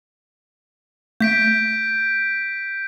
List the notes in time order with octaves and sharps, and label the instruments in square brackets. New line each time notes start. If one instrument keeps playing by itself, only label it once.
[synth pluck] A3 [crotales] G6 B6 D7